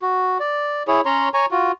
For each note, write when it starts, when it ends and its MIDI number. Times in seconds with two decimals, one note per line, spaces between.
0.02 0.38 66
0.40 0.83 74
0.88 1.01 64
0.88 1.01 68
0.88 1.01 73
1.06 1.29 61
1.06 1.29 73
1.06 1.29 82
1.06 1.29 84
1.34 1.46 73
1.34 1.46 80
1.34 1.46 82
1.34 1.46 85
1.51 1.72 65
1.51 1.72 66